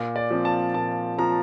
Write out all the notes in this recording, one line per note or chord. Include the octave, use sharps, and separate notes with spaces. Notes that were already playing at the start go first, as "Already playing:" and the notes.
Already playing: A#2
D5
F3 C4
A5
A#2 A5
F3 C4 A#5